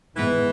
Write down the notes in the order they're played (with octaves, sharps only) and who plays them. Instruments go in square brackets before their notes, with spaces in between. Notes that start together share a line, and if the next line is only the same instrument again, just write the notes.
[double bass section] G#2 D#3 G#3 B3 [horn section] E3